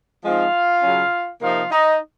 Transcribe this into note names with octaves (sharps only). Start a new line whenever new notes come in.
F3 G#3 C4 D#4 F4 F5
C#3 F#3 C#4
C3 F3 A#3 D#4 F4 F5
D#4 D#5